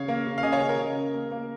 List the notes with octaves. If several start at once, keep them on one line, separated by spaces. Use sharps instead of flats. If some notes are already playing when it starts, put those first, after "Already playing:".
Already playing: C#3 C#5 F5
A#3
C#3
F5
C#3 D#5 G#5
C#5 F5
C#3
A#4
C#3
C#3
A#3
A#3